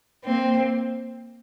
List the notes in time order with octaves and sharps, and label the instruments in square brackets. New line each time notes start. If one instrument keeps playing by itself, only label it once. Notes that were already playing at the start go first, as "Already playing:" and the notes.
[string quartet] A#3 C4